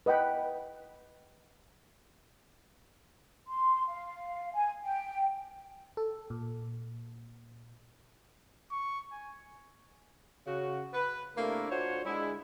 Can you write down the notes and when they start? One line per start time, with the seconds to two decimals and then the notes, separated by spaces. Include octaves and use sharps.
0.06 B4 D#5 F#5 G5 B5
3.47 C6
3.87 F5
4.53 G#5
4.82 G5
5.97 A4
6.30 A#2
8.71 C#6
9.12 G#5
10.47 C#3 F#4
10.93 B4
11.37 C3 A3 A#3 D4 E4 A#4
11.70 D4 F4 F#4 C5 C#5
12.05 D3 G#3 E4